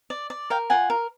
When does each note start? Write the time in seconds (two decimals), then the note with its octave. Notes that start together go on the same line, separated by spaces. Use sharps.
0.10 D5
0.30 D5
0.50 A#4 F5 G5
0.70 F4 F#5 G#5
0.90 A#4